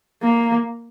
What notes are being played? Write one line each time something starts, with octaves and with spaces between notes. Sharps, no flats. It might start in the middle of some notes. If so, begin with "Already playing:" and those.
A#3